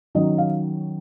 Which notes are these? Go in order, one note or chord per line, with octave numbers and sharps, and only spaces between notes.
D#3 F#3 C#4 D#5
F5